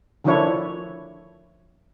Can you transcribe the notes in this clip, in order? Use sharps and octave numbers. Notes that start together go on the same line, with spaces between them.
D3 D#3 F3 D4 E4 C#5